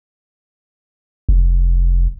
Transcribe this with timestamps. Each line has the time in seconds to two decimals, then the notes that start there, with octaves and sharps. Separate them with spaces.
1.29 F1